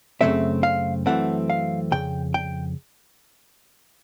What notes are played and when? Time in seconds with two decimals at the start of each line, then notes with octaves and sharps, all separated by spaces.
0.21 F#2 C#3 E3 A3 C4 E5
0.63 F5
1.06 F#2 C#3 E3 A3 C4 F#5
1.50 F5
1.91 F2 C#3 G5
2.34 G5